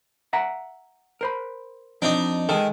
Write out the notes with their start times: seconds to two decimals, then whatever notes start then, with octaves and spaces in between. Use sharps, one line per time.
0.33 E5 F#5 A#5
1.21 A#4 C5 B5
2.02 F2 C4 D4 D#4
2.49 D#3 G#3 G#4 A4